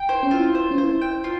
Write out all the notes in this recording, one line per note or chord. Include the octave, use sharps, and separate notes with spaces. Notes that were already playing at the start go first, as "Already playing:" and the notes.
Already playing: G5
C5
C#4
E4 F4
C5
C#4
E4 C5
G5
F4